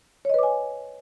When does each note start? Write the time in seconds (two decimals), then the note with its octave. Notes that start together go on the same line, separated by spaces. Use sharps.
0.25 C#5
0.29 D#5
0.34 B4
0.39 D6
0.43 G#5